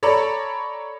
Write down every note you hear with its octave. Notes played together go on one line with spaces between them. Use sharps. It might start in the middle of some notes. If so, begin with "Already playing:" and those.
A4 C#5 D5 A#5 B5